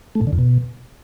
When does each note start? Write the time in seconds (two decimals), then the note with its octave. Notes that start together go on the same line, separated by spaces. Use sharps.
0.15 A3
0.21 A2
0.27 D3
0.33 F2
0.39 B2